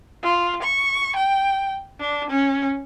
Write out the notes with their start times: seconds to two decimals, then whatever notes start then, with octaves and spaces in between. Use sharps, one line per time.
0.23 F4
0.62 C#6
1.16 G5
2.00 D4
2.30 C#4